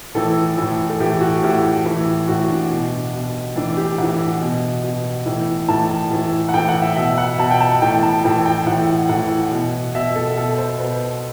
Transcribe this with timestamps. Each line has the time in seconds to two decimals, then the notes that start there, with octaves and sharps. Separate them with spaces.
0.15 A2 E3 A4
0.57 A2 E3
0.90 A4
1.00 A2 E3 G4
1.21 F#4
1.43 A2 E3 G4
1.85 A2 E3
2.28 A2 E3 F#4
2.49 D4
2.70 B2
3.13 B2
3.55 A2 E3 D4
3.77 G4
3.98 A2 E3 F#5
4.41 B2
4.84 B2
5.26 A2 E3
5.68 A2 E3 A5
6.11 A2 E3
6.49 F#5
6.54 A2 E3 G5
6.69 F#5
6.82 E5
6.96 B2 E5
7.18 F#5
7.38 B2 A5
7.51 G5
7.61 A5
7.82 A2 E3 G5
8.03 A5
8.24 A2 E3 G5
8.46 G5
8.66 A2 E3 F#5
9.09 A2 E3 F#5
9.51 B2
9.95 B2 E5
10.16 A4
10.37 B2 A4
10.58 C5
10.80 B2 B4